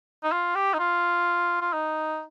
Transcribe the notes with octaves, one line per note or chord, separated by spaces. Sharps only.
D#4
F4
G4
D#4
F4
F4
D#4